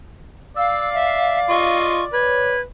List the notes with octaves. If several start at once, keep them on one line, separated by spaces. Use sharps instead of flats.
D5 F5 E6
E5
F4 D#5 C#6
B4 C#5 G#6